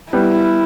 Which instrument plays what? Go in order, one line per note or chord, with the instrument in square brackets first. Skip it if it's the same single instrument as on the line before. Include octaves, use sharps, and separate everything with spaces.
[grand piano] G3 B3 [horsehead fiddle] E4